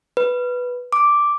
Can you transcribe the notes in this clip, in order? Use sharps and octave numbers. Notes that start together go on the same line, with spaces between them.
B4
D6